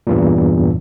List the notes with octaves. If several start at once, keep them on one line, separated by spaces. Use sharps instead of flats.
E2 G2 A#2